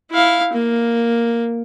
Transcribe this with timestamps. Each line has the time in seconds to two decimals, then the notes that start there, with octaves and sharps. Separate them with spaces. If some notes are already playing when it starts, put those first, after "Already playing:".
0.11 E4 F5
0.53 A#3